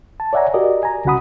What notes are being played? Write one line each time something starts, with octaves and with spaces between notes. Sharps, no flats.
A5
C#5 D5 E5 F#5 G#5 A#5
F#4 G4 A#4 D5 D#5
G#5 A#5
C2 C#3 F#4 F#5 B5 D#6